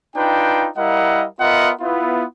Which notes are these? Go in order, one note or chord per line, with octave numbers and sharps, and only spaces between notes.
D4 D#4 F4 B4 G5
G3 E4 A#4 D#5 F5 F#5
B3 F4 A#4 D#5 E5 F#5
B3 E4 F4